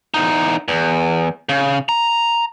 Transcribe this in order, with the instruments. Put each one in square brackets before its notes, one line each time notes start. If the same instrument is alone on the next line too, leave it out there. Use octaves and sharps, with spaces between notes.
[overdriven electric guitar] E2 D#4
E2
C#3
A#5